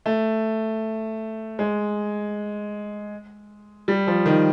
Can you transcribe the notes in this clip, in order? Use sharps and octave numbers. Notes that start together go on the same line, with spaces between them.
A3
G#3
G3
F3
D#3